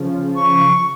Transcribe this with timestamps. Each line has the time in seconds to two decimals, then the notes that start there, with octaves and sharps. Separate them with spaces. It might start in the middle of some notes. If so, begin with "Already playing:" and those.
Already playing: C#3 F3
0.35 C#6